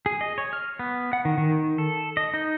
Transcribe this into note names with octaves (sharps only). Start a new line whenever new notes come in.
G#4
D#5
C#5
F6
B3
F#5
D#3
D#3
A4
D#5
D#4